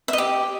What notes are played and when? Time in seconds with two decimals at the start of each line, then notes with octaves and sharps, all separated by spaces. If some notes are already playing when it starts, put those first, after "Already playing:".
0.08 E5
0.13 D#5
0.18 G4